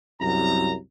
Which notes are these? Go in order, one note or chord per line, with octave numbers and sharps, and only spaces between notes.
C2 F#2 A#5